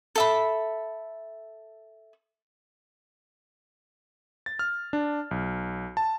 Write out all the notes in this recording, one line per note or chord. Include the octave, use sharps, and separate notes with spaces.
A4 E5 B5
A6
F6
D4
B1
A5